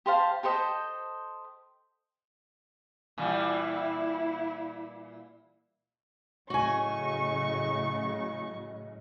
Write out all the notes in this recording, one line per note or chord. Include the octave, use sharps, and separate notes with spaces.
G4 C5 F5 A5
G4 A4 C5 D#5
A#2 E3 G3 E4
A2 C#3 F#3 F#4 D#5 G#5 C#6